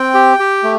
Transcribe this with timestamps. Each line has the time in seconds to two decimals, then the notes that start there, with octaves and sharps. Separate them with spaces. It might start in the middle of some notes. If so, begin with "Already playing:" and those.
Already playing: C4 G5
0.14 G4
0.39 G4
0.63 A3